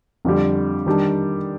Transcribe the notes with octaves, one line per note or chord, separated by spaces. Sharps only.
F2 D3 G3
D#3 G3 D4